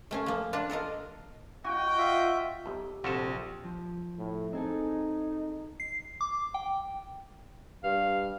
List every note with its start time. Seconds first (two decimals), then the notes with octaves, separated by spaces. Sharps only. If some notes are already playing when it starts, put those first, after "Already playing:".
0.11 A3 C#4 F5
0.26 F3 A#3
0.53 D4 F4 A#4 F#5
0.70 A4 A#4 D#5 F5
1.64 F#4 D#5 G5
1.98 F4 E5
2.66 B1 G4
3.04 A#1 C3 F4 F#4 A4
3.65 F3
4.18 A2
4.53 C4 D#4 G#4 A4
5.80 C7
6.21 D6
6.54 G5
7.83 G2 F5